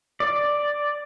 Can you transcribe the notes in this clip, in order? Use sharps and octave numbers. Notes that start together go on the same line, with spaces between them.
D5